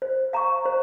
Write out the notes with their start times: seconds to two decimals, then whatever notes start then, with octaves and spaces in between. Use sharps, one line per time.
0.02 C5
0.33 F5 A#5 C#6
0.65 C5